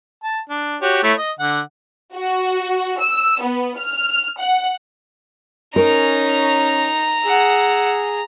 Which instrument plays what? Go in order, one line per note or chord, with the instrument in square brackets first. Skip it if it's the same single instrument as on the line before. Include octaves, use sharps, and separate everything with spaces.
[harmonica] A5
D4
F#4 G4 C#5
A3 E4 C#5
D#5
D3 F#5
[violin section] F#4
E6
B3
F6
F#5
[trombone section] C#4 [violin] D#4 [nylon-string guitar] A#4 [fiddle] A#5
[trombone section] G#4 [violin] F#5 E6